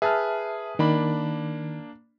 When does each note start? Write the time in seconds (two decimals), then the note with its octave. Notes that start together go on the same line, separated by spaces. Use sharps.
0.02 G#4 B4 E5 A5 F6
0.79 D#3 A#3 D4 B5